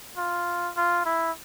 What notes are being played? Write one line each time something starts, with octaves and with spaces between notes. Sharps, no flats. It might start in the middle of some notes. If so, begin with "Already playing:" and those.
F4
F4
E4